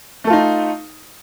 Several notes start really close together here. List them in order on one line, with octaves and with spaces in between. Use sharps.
A3 A4 F4 D#4